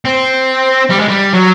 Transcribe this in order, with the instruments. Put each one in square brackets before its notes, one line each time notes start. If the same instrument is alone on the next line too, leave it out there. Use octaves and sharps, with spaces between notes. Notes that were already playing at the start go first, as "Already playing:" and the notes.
[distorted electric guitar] C4
G3
G#3
G3
F#3